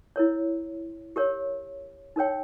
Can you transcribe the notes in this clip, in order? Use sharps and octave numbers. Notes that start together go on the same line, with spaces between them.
E4 A#4 C#5
G4 A#4 C#5
D#4 A#4 C#5 G5